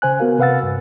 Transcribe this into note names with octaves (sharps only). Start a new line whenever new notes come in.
C#3 C5 G#5 F#6
B3 F#4 A#4 F5
C3 B4 F5 F#5 E6 A6
G2